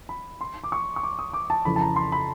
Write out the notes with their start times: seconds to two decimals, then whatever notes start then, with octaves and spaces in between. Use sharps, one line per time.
0.09 B5
0.41 C6
0.64 D6
0.72 C#6
0.96 C#6
1.03 D6
1.19 D#6
1.33 D6
1.50 A5
1.65 F2 C#3 E3 B5
1.76 A5
1.81 A#5
1.96 C6
2.12 B5